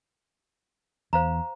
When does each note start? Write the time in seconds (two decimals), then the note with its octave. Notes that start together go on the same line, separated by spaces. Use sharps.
1.13 E2 C5 F5 A#5